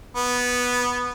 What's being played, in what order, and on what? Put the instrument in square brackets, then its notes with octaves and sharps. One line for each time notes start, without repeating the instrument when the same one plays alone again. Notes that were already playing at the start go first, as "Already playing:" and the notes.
[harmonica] B3